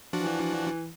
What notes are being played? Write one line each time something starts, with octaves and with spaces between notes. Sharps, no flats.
E3 F3 D4 F#4